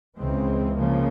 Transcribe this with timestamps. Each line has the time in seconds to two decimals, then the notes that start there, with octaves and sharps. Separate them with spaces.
0.19 C#2 C#3 E3 G#3 C4
0.76 C#3 F3 A#3